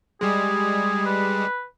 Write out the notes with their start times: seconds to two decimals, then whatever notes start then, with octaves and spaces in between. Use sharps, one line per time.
0.21 G3 G#3 G#4
1.06 B4